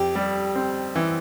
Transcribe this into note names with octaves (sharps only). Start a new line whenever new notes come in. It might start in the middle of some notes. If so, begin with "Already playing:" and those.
Already playing: F2 G4
G3
C4
E3